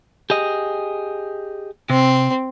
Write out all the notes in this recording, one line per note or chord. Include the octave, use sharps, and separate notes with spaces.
G4 G#4 D#5
C3 C4